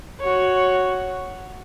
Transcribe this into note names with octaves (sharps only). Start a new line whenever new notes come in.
F#4 C#5